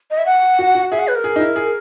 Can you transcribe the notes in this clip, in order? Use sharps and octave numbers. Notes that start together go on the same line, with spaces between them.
D#5
E5
F#5
F#4
F#4
G#4 E5
F#5
B4
A#4
G#4
D#4
E4
G#4